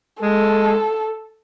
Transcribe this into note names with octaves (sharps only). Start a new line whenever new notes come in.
G#3 A4